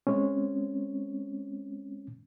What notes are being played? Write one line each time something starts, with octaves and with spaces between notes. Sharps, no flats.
G#3 C4 C#4